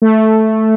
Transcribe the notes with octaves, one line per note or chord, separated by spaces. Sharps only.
A3